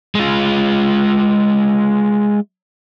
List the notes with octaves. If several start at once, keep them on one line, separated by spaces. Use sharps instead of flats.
G#3 F4